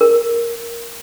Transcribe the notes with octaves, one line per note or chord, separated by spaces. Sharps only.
A#4